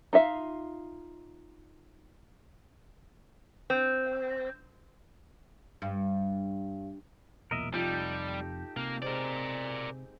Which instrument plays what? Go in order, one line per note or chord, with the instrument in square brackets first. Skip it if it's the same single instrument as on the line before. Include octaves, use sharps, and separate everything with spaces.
[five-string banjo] D#4 F4 E5 F5
[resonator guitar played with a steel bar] C4
[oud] G2
[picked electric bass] B1 E2 A#2 [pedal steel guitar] A#4 D#5 E5
[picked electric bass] F1 F2 [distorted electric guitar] G3 [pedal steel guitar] D#4 G4 A4 [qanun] F4
[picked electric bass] C3 [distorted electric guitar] A#3
[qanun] G#3 C4 [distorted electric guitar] A#4 D5